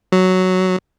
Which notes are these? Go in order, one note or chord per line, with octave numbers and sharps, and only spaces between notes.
F#3